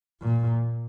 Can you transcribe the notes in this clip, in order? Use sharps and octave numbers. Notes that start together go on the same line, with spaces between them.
A#2